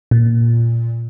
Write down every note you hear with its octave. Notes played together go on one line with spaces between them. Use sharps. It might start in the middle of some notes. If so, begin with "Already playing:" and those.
A#2